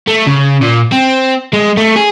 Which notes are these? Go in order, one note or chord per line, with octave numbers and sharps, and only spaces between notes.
A3
C#3
A#2
C4
G#3
A3
G#4